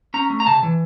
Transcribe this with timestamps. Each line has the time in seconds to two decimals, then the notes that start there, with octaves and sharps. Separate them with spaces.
0.14 C#4 A#5
0.30 A3
0.40 A#5
0.47 C#3 A5
0.63 E3